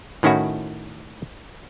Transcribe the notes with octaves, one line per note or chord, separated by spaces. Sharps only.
A2 D#3 C#4 E4 F#4